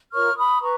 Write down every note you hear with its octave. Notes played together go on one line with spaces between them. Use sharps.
F4 A#4 C#5 C#6 F6
B5 D#6
B4 A#5 C#6